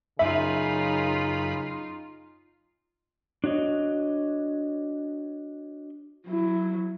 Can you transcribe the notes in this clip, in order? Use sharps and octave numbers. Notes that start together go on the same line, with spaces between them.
F#2 C#3 D#4 F4 E5 B5
D4 F#4 C#5 D#5
F#3 E4